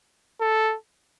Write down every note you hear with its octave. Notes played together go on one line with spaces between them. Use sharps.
A4